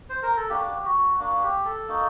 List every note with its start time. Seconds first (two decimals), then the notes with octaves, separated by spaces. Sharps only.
0.10 C5
0.23 A#4
0.37 A4
0.49 A#3 D4 F#4 G4
0.85 F#4
1.19 A#3 D4 F#4
1.43 G4
1.65 A4
1.88 A#3 D#4 F#4